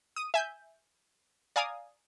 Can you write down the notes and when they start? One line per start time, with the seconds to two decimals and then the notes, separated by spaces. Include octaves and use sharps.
0.16 D#6 D#7
0.34 E5 G#5 G6
1.56 D5 F5 G#5 A#5 D#6